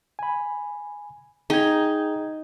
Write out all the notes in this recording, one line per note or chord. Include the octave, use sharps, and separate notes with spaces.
G#5 B5
D#4 G#4 G5 G#6